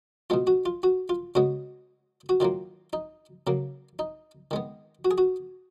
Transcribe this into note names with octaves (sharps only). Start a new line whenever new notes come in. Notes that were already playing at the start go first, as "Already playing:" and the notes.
B2 G#3 B3 F4
F#4
F4
F#4
F4
C#3 G#3 B3 F#4
F#4
D#3 F#3 A#3 F4
D#4
C#3 F#3 A#3
D#4
D#3 G#3 B3
F#4
G#4
F#4